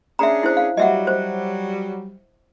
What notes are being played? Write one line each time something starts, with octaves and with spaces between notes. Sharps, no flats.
C#4 D4 G#4 E5 A#5
E4 C5
F5
F#3 G3 D#5 E5 F#5
C5